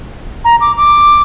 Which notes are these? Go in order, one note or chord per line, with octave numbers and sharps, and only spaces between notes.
A#5
D6
D6